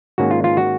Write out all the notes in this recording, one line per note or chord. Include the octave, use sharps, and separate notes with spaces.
G#2 D#3 A#3 C#4 F#4
F4
F4
F#4